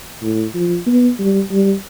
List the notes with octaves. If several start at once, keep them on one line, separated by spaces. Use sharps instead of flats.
A2
F3
B3
G3
G3